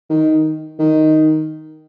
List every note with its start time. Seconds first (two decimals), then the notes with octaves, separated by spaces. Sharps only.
0.10 D#3
0.79 D#3